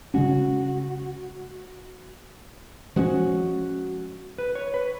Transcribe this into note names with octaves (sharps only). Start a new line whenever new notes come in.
C#3 G#3 C#4 F#4
F3 G#3 C#4 F#4
B4
C#5
B4